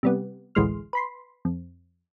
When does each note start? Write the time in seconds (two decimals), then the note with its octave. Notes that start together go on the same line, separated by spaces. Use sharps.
0.03 C3 G3 B3
0.55 A1 D2 E3 G#3 C6 F6
0.93 B4 B5 C6
1.45 F2